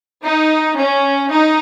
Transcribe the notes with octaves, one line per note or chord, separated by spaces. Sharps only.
D#4
C#4
D#4